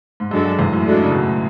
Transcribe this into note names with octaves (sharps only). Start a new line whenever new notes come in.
G#2
F#2 G#3 D4 F#4 A4
F#2
E2 G#2
F#2 A2
G#3 D4 F#4 A4
C#3
B2
A2